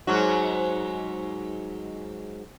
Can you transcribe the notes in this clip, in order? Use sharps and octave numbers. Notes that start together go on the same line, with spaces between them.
G#2 F#3 F#4